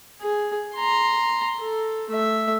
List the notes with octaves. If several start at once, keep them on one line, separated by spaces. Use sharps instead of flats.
G#4
A#5 C6
A4
A3 E5